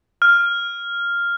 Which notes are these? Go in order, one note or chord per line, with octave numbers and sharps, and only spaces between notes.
F6